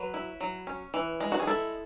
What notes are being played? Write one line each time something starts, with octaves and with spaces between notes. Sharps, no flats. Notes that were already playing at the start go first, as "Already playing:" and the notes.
Already playing: F#3 B4
E4
F#3
C#4
E3
G#3
F#4
G#4
E4 A4